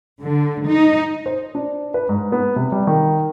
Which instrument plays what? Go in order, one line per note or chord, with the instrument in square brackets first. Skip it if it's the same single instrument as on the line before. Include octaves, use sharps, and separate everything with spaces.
[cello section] D3
D#4
[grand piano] C5
D4
B4
G#2
B3
C3
G3
D#3